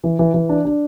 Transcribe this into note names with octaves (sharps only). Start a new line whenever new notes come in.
E3
E3
E3
D4
D4